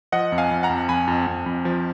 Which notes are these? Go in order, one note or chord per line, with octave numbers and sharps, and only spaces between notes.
F3 D#5 F#5
F2
F5 G#5
F2
F#5 A#5
F2
F2 G#5 B5
F2
F2
F2
F3